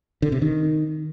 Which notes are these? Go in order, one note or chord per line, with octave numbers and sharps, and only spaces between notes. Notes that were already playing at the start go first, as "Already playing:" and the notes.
D3
C3
D#3